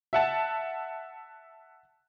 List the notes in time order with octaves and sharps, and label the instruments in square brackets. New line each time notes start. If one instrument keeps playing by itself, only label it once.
[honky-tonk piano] E5 F#5 A5